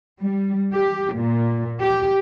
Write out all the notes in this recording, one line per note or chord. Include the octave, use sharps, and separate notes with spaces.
G3
G4
A#2
G4